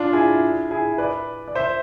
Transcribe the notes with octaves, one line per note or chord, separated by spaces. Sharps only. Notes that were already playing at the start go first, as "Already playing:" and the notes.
Already playing: D4 F4
E4 G#4
E4 G#4
B4 D5
D5
C5 E5